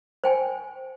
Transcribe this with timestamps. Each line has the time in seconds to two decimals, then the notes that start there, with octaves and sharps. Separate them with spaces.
0.24 C5 G5 G#5